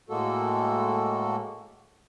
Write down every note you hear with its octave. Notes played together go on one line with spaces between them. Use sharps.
A2 G#3 A#3 F#4 A4